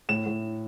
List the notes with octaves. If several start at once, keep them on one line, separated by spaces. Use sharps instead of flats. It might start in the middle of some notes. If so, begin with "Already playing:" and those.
A2 E7
A2